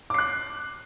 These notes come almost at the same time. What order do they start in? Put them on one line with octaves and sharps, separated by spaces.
D6 C7 F#6